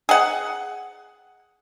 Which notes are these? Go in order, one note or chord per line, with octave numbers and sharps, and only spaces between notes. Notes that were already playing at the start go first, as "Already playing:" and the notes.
G#4 F#5